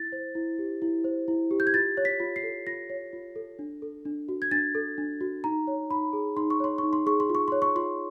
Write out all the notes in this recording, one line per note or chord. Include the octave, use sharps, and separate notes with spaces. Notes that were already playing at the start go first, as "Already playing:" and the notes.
Already playing: E4 A6
C5
E4
G4
E4
C5
E4
G4
G6
G#6
F4 A6
C#5
B6
F4
C7
A4
F4 A#6
C#5
F4
A4
D4
A4
D4
F#4
G#6
D4 A6
A4
D4
F#4
D#4 A#5
C#5
D#4 B5
G#4
D#4 C6
C#6
C#5 C6
D#4 C#6
C6
G#4 C#6
C6
F4
C#6
C#5 C6
C#6
F4 C6